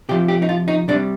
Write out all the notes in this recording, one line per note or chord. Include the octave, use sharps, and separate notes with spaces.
C3 F3 G4
G4
D#4
F4
D#4
C3 G3 D4